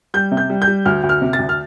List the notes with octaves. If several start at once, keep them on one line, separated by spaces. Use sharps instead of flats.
G3 G6
C3
G6
G3
G6
G3
D2 F6
D2
F6
C3
A6
D2
F6